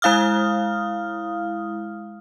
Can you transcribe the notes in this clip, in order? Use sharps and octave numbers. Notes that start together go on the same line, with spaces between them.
G#3 E4 F5 D#6 F6